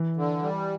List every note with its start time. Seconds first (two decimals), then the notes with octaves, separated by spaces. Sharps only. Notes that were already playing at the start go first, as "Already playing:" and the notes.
Already playing: E3
0.16 D3
0.42 G3